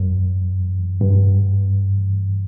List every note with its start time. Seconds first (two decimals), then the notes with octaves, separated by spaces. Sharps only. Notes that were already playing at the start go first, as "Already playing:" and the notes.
Already playing: F#2
1.01 G2